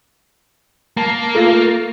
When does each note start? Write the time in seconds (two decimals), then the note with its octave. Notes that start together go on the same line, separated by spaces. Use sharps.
0.97 A#3 A5
1.35 A3 F4